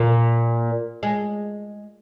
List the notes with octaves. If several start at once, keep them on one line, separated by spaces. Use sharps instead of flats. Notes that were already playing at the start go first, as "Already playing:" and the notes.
Already playing: A#2
G#3